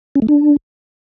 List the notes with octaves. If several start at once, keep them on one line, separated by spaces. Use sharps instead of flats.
C#4
A3
D4